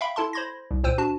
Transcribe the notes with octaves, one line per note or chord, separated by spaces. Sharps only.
E5 F5 G5 B5
E4 A4 A5 C6
C5 B5 C6 G#6 A#6
C2
C#2 A#2 C5 G5 E6 D#7
D4 F#4 A5